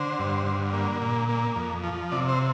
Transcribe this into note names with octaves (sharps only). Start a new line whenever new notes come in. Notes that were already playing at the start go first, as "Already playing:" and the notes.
Already playing: D3 C5
G2
D3
A#3
A#2
A#3
F2
F3
C3 D5
C5